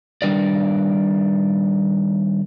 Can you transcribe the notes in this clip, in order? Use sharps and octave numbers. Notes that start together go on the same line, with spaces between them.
D#3 G3 D4 A#4 B4 D5